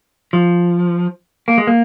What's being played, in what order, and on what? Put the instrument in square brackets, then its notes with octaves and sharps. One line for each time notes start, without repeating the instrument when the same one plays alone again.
[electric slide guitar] F3
A#3
G#3
A#3